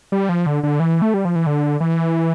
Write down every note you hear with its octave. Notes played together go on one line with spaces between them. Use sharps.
G3
F3
D3
D3
E3
A3
G3
F3
E3
D3
E3